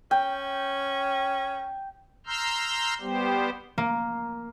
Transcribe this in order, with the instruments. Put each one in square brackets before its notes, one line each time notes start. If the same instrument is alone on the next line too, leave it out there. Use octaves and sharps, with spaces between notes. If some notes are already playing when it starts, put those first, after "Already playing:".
[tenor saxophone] C#4 [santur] G5
[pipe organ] A#5 C6 E6 F6 G6
G3 B3 G4 C5
[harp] A#3